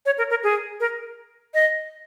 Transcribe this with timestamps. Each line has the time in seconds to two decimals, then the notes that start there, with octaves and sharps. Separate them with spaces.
0.06 C#5
0.18 A#4
0.30 A#4
0.44 G#4
0.80 A#4
1.54 D#5